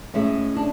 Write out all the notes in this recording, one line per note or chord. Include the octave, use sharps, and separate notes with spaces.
A2 G#3 C#4 E4
D4